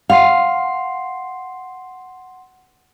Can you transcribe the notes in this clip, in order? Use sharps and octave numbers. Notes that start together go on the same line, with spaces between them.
F5 F#5 C6 C7